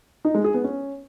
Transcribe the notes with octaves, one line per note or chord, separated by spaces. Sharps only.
D#4
G#3
G#4
B3
C#4